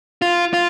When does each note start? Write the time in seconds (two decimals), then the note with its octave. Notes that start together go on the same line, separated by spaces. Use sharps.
0.22 F4
0.53 F4